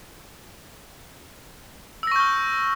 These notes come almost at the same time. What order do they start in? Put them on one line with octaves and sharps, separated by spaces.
E6 A#6 C#6 G6 F6